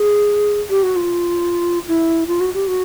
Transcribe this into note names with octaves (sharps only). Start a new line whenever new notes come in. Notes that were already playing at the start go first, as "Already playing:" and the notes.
Already playing: G#4
G4
F#4
F4
E4
F4
F#4
G4
F#4